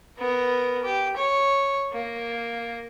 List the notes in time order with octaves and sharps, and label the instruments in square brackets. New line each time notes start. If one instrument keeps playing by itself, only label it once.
[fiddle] B3 A#4
G4
C#5
A#3